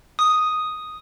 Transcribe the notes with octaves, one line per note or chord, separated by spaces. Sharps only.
D#6